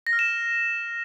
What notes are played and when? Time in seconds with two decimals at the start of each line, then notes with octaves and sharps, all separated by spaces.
0.07 A#6
0.13 F6
0.19 E7